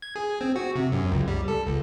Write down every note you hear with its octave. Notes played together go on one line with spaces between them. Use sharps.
G#6
G#4
C4
F#4
C3
F#2
C#2
G3
A4
C#2